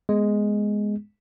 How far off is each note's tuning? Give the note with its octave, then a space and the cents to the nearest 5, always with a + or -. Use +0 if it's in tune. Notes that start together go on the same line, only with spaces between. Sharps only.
G#3 +0 B3 -5